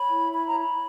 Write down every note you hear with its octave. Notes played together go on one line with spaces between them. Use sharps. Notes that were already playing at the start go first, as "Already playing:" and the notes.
Already playing: C#5 B5
E4
C#5 B5
A#5
C#5 B5